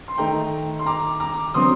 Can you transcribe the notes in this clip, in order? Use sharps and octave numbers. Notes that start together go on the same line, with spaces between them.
C6
D#3 A3 D#4 G5 A#5
C6
A#5 D6
A#5 D6
D3 F#3 C4 C6 D#6